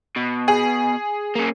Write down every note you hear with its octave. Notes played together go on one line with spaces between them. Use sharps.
B2
G#4
A#3 C#4